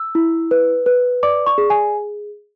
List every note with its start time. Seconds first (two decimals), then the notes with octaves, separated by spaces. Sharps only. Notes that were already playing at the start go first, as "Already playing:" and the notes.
Already playing: E6
0.15 E4
0.51 B4
0.86 B4
1.23 D5 D6
1.46 C#6
1.58 G#4
1.70 G#5